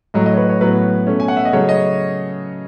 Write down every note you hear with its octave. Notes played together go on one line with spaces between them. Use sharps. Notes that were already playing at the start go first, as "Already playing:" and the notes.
A2 F#3 A3 D#5
D#5
C#5
B4
C#5
A2 F#3 B3 B4
B2 A3 C#4
G#5
F#5
E5
D#5
C#3 F#3 A3 C#4 C#5
D#5